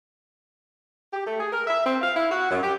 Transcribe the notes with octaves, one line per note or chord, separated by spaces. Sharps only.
G4
A3
G#4
A#4
E5
C4
F5
E4
F#4
F#2
G4